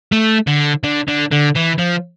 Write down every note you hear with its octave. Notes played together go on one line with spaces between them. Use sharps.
A3
D3
D3
D3
D3
E3
F3